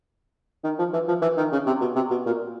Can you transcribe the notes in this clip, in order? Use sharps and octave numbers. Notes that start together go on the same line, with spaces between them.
D#3
F3
E3
F3
E3
D#3
C#3
C3
B2
C3
B2
A#2